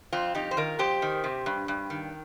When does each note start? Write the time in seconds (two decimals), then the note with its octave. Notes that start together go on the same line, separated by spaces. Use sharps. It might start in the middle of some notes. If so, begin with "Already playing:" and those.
0.13 F2 C4 F4
0.35 F2 D#4 G4
0.51 C5
0.57 D#3 F4 A#4
0.79 F2 G4 C5
1.02 D#3
1.24 C3
1.46 G2
1.68 G2
1.90 D#3